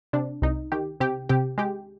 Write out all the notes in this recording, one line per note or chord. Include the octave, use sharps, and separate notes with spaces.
C3 D4
C2 D#4
D#3 G4
C3 G4
C3 G4
G#3 G4